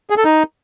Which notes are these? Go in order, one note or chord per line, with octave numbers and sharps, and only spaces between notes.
G#4
A4
D#4